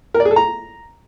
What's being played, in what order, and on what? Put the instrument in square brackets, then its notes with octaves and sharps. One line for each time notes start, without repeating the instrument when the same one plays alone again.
[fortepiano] A#4
D5
G#4
A4
A#5